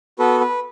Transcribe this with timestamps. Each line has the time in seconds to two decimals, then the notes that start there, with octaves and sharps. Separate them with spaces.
0.19 B3 F#4 A4 B4
0.40 B4